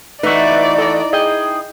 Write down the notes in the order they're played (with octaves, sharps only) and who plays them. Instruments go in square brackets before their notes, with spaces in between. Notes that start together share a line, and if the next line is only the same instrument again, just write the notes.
[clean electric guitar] E3 A3 F#4 [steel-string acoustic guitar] D#4 E4 [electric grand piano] B4 E5 [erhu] D5
[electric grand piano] A4 D#5 A#5
[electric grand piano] G#4 G5 G6 [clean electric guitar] D#5